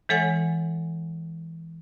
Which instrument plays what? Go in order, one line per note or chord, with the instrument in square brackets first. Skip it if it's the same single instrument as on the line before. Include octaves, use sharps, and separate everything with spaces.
[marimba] E3 G#3 A4 C#5 F#5 G#5